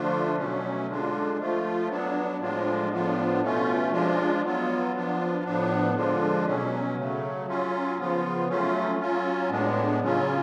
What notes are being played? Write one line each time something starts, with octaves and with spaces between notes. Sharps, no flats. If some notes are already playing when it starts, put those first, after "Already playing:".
Already playing: D3 F3 A3 D4 F4
B2 F#3 A3 C#4
D3 G#3 D4 F4
F3 A3 F4
F#3 B3 D4
A2 F3 G#3 D4 F4
A2 F3 B3 D4 F4
B2 A3 C#4 F4
F3 G#3 D4 F4
F#3 B3 F4
F3 B3 D4 F4
A2 F3 B3 D4
D3 F3 G#3 D4 F4
B2 F#3 C#4
C#3 F#3 A3
F#3 C#4 F4
C#3 F3 B3 F4
F#3 A3 C#4 F4
F#3 C#4 F4
A2 G#3 B3 D4
C#3 F#3 C#4 F4